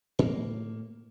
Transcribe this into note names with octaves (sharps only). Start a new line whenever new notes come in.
A2 A#3